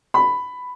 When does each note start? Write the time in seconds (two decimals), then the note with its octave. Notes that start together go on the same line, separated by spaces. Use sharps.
0.14 B5